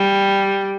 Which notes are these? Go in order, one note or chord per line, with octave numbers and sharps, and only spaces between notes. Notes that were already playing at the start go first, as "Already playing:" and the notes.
Already playing: G3